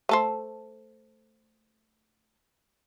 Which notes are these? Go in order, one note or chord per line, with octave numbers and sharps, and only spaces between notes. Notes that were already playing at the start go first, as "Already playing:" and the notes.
A3 A4 C5